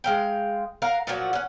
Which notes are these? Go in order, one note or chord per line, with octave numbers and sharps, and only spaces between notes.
G#3 F5 G5
A#4 F5 F#5
A#2 F3 F#3 F#4
C#4 F#5